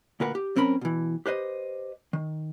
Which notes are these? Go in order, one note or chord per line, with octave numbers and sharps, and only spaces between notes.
D2 A#2 A#4 B4 F#5
G4
F#2 C4 C#4 A#4 B5
B2 E3
G4 B4 C5 D#5
D#3